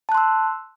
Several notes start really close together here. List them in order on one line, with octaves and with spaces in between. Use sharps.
A5 F#6 C6 E6